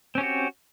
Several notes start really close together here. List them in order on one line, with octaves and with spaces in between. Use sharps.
C4 C#4 G4 F#4